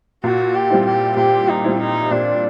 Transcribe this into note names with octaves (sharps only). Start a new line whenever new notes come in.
A#2 F#4
G4
G3 C4 E4
G4
A#2 G4
D#4
G3 C4 E4
D#4
A#2 D4